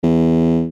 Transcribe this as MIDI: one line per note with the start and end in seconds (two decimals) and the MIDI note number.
0.03 0.66 40